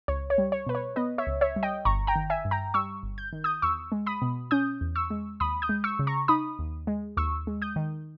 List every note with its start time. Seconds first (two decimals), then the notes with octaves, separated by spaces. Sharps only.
0.08 C#2 C#5
0.30 C#5
0.38 G3
0.52 C#5
0.67 B2 B4
0.75 C#5
0.96 B3 B4 D#5
1.18 C#5 E5
1.27 C#2
1.41 C#5 E5
1.56 G3
1.63 D#5 G5
1.85 G1 A#5 C#6
2.07 G5 A#5
2.16 D#3
2.30 E5 G#5
2.45 G2
2.51 G5 A#5
2.74 G3 C#6 E6
3.03 G1
3.18 G6
3.33 D#3
3.44 D#6 G6
3.62 E2 C#6 E6
3.92 G#3
4.06 B5 D#6
4.22 B2
4.51 C#4 D#6 G6
4.81 E2
4.96 C#6 E6
5.10 G#3
5.40 D#2 B5 D#6
5.62 D#6 G6
5.69 G#3
5.84 C#6 E6
5.99 C#3
6.07 A#5 C#6
6.28 D#4 B5 D#6
6.59 D#2
6.87 G#3
7.17 D#2 C#6 E6
7.47 G#3
7.62 D#6 G6
7.76 D#3